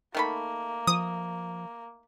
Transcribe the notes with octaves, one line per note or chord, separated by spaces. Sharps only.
D#3 A3 A#3 B5
F3 D#6